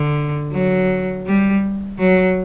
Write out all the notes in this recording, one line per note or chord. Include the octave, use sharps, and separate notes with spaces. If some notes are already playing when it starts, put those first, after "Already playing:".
Already playing: D3
F#3
G3
F#3